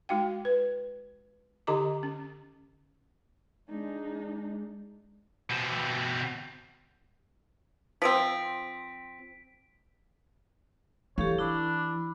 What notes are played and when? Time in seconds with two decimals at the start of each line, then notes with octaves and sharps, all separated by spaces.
0.09 G#3 D#4 F#4 F5 G5
0.45 B4
1.67 D3 D#4 G4 D#5 A#5 D6
2.03 C#4
3.69 G#3 D4 D#4
5.50 B2 C4
8.02 F3 C4 B6 D7
11.18 E3 G4 A4 C#5 F5
11.39 D4 E4 B5